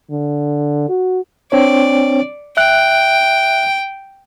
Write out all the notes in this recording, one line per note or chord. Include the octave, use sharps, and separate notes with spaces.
D3
F#4
C4 D4 C#5 D5
E5 G5 F#6